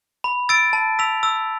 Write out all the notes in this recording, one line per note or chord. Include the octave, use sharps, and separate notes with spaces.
B5
E6 A6 D7
A5
E6 B6 F7
E6